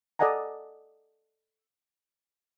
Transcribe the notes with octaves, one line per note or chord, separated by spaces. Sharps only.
A4 D5 D#5 F#5 G#5 A#5